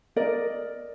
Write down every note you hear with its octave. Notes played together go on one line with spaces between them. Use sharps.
A#4 D5 D#5